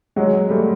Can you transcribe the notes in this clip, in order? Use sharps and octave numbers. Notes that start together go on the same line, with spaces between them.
F#3 G#3
G3 A3